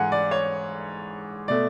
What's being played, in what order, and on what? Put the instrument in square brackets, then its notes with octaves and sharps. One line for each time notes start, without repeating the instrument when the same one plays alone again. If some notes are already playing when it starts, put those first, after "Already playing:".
Already playing: [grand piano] G#2 E3 F#5 G#5
D5
C#5
B2 A3 D5